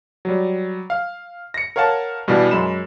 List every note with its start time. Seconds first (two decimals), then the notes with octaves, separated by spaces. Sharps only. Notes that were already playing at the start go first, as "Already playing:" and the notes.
0.25 F#3 G3
0.90 F5
1.54 A#6 C#7
1.76 A#4 C#5 F5 F#5 A5
2.28 G2 B2 E3 G3
2.51 F#2 G#3 B5 E7